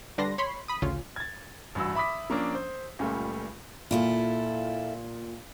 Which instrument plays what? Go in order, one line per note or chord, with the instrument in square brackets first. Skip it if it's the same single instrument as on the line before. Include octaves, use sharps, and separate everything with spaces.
[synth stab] D3 G3 D4 B4 C6 A#6
C#5 B5 C6
B5 D#6
A1 D2 C#3 C#4 F4
[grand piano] G#6 A6
A1 G2 F#4 E6
E5 B5 D6 D#6 B6
F3 A#3 C#4 D4
C5
C#2 A#2 C#3 G3 A3
[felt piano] A#2 [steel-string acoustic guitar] E4 F4 A4